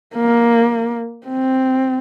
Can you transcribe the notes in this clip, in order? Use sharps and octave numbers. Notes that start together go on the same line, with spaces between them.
A#3
C4